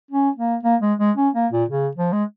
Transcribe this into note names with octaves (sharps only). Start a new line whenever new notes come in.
C#4
A#3
A#3
G#3
G#3
C#4
A#3
A#2
C#3
F3
G#3